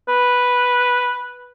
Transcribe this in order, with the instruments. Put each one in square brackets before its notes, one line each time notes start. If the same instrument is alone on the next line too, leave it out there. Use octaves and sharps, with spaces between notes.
[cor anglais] B4